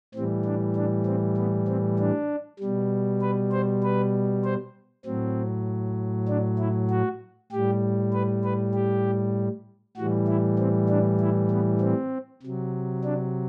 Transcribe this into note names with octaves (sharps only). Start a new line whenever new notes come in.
A2 E3 G3 C4
D4
D4
C4
B3
C4
D4
B2 G3
B4
C5
B4
C5
A2 F#3 C4
D4
E4
F#4
A2 G3 G4
B4
B4
G4
A2 E3 G3 F#4
E4
C4
D4
E4
B3
C4
C3 F#3
D4